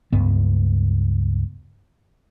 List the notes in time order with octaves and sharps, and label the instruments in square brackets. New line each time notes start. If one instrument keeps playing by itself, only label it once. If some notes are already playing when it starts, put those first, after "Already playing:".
[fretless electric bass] C#2 G2 B3